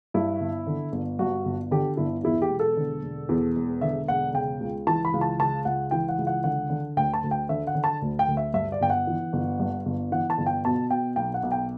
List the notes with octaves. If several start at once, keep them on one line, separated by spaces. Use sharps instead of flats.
G2 E4
G1
D3
G1
G2 F#4
G1
D3 G4
G1 E4
E2 E4
G4
E1
A4
D3
E1
E2
E1
D3 E5
E1 F#5
C#3 G5
C#2
E3 A5
B5
C#2
A5
C#3 A5
C#2 F#5
E3 G5
F#5
C#2
F#5
D3 F#5
D3
D2 G5
A5
D2
G5
D3 E5
F#5
D3
A5
D2
G5
D2
E5
G2 E5
D5
G1 G5
F#5
E3
G1
G2
G1
E3 F#5
A5
G1
G5
B2 A5
B2 G5
B1 G5
F#5
B1
G5